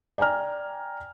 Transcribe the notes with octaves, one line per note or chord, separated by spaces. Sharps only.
D5 G5 G#5 A#5 F6